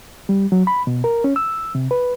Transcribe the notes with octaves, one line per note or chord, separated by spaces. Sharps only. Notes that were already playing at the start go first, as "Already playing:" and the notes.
G3
F#3
B5
B2
A#4
C#4
E6
C3
B4